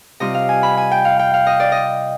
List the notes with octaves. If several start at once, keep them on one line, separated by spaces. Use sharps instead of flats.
C3 G3 C4 F4 D#5
F5
G#5
B5
G#5
G5
F5
G5
F5
D#5
D5
D#5